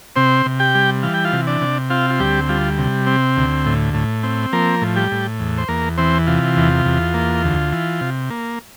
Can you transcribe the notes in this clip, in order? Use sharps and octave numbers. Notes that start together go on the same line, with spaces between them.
C3 C4 C5
C3
G4 G5
G3
E3 F5
G5
F4 F5
C3
D4 D5
C3
C4 F4 F5
F4
D2 G3 G4
G3 F4
C3
C4
D2
A2
A2
C4
F3 A#3 A#4
A2
G3 G4
A2
E2
C5
E2 A#3 A#4
E3 C4 C5
C3 F4
E2
E2
A#3
D2
E3
C3
A#3